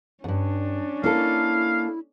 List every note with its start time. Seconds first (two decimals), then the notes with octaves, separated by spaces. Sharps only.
0.24 E2 G2 C#4 D4
1.03 A#3 E4 A4 F5